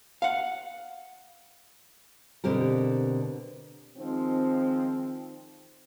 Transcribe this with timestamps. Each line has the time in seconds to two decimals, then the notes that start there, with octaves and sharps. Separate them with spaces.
0.22 F5 F#5
2.44 B2 D3 C4 G4 A#4
3.98 D#3 F3 G#3 C4